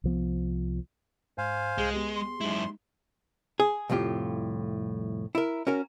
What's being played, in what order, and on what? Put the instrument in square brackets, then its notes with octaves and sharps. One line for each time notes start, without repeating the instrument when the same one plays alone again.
[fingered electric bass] C2 F3 B3
[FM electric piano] G#2 [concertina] C5 F5 G#5
[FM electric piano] C2 G#4 [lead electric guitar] G#3
[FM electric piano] B3 G4 G#4
[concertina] C6
[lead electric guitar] F#2 E4 [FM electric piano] G#3 D#4
[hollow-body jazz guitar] G#4
C2 F2 A2 F4 G4
E4 A#4
C#4 F#4 A#4